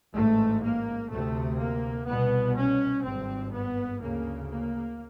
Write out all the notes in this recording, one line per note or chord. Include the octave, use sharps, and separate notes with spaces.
A1 G#2 A3
A#3
D2 C3 A3
A#3
C2 B2 B3
C#4
G#1 G2 C4
B3
D2 C#3 A#3
A#3